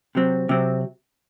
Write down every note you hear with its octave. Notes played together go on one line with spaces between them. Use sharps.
C3 F#3 C4
C3 F#3 C4